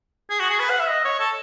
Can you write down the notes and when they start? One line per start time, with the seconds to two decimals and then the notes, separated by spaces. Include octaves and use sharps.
0.30 G#4
0.40 F#4
0.50 G#4
0.60 B4
0.70 F#5
0.80 E5
0.90 D#5
1.05 C#5
1.20 A4